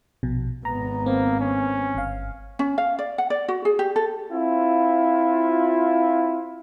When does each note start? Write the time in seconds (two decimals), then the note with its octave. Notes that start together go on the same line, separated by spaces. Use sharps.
0.23 A#1 B2
0.65 G#1 B3 A#5
1.06 A#3 C4
1.40 C#4
1.95 G1 F5
2.59 C#4
2.78 F5
2.99 D5
3.18 F#5
3.30 D5
3.48 F#4
3.65 G#4
3.79 G4
3.96 A4
4.33 C4 E4 F4